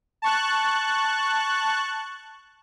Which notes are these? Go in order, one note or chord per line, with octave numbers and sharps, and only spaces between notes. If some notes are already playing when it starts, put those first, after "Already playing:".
A5 C#6 F#6